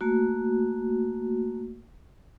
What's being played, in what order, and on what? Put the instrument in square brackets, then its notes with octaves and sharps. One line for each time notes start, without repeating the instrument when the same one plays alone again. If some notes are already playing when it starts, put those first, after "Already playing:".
[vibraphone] A3 A#3 F#4